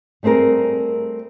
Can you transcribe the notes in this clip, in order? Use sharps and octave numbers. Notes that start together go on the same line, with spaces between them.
G3 A3 C4 G#4 A#4